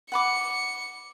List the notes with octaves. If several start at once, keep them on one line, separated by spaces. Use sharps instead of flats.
F#5 B5 D6 C#7